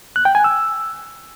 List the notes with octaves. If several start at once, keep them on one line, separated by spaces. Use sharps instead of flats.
F#6
G5
G#5
E6